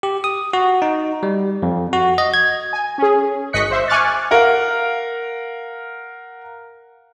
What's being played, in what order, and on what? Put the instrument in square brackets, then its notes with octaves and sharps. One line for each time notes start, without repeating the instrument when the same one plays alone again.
[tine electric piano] G4
D#6
F#4
D#4
G3
F2
F#4
D#5
G#6
[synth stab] G#5
C#4 G#4
G#1 D#5 C#6 F#6 B6 C#7
C5 E5
G#5 C#6 D6 F6 F#6 A6
[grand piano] A#4 F5 F#5